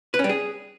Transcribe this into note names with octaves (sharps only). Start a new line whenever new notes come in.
B4
C#4
G3
G#4